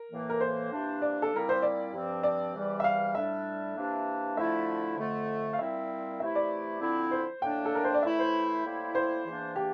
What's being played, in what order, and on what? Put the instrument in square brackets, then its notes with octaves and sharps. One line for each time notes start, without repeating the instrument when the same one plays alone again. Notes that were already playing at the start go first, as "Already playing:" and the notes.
Already playing: [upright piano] A#4
[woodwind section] A2 E3 A#3
[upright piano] A#4
C5
[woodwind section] C3 E3 A#3 D4
[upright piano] D5
A4
[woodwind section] A#2 G3 C4 E4 [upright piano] A#4
[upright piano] C5
D5
[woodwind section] G2 F3 C4
[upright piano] D5
[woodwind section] E2 C3 E3 G3
[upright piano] E5
F5
[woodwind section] A2 G3 D4 [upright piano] E5
[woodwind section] C3 E3 A#3 D4
[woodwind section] D3 F3 A3 E4 [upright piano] E5
[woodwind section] F2 D3 A3
[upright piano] F5
[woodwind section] A#2 G3 C4 E4 [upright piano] E5
[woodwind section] C3 E3 A3 E4 [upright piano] E5
[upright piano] D5
[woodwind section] D3 F3 C4 E4
[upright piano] C5
[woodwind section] A2 G3 A#3 D4 [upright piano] G5
[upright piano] A4
A#4
C5
D5
[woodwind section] A2 E3 A3 E4 [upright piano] E5
[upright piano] C5
[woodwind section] A2 G3 A#3 E4
[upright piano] C5
[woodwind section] E2 E3 A#3 D4
[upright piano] G4